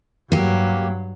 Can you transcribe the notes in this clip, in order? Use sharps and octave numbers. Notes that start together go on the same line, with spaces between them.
G2 F#3 A#3 G4